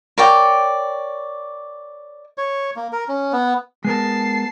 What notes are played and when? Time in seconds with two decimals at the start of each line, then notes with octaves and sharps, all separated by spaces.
0.18 A#4 C#5 D5 G5
2.38 C#5
2.76 A#3
2.92 A#4
3.08 C#4
3.32 B3
3.85 G#3 B3 A#4 A5 C7